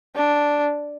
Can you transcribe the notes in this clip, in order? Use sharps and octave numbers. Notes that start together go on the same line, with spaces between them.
D4